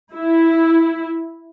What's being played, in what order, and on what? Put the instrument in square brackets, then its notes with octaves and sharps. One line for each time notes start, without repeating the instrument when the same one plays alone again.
[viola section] E4